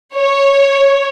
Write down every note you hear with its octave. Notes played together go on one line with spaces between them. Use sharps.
C#5